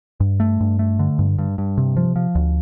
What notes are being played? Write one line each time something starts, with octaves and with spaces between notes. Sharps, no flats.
G2
A3
G2
A3
D3
G2
G2
G2
C3
F3
F3
D2